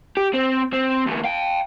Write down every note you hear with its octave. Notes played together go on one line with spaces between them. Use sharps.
G4
C4
C4
D2 E3
F5 G5